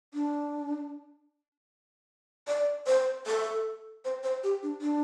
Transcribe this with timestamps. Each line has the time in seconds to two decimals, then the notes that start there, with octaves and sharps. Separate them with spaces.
0.14 D4
2.48 D5
2.87 C5
3.27 A4
4.05 C5
4.24 C5
4.44 G4
4.63 D4
4.82 D4